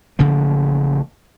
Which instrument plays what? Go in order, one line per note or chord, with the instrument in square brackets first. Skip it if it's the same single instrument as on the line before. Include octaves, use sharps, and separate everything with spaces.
[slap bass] A1 C#3 F3 A#3